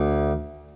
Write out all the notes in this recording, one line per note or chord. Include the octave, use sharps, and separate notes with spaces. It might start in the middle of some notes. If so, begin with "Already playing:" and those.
Already playing: D2